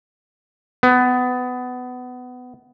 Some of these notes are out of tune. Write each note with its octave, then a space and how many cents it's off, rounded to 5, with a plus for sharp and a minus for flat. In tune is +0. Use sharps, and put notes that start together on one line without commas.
B3 +20